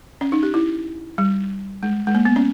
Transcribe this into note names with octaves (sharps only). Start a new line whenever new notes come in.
C#4
D#4
G4
E4
G3
G#3
G#3
A#3
B3
C#4